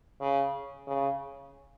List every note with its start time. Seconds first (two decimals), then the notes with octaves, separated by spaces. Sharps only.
0.21 C#3
0.87 C#3